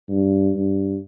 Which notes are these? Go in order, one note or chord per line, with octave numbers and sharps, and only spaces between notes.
G2
G2